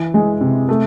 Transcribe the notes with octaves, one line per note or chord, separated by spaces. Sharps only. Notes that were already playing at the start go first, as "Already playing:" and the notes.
Already playing: E3
G#3
C3
A3